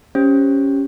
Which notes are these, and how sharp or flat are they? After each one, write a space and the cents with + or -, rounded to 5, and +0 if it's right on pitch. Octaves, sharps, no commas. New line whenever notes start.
C#4 +0 G4 +0 C5 +0